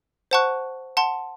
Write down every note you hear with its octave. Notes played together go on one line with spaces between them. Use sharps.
C5 F#5 A5 C#6 F#6
F#5 A5 C6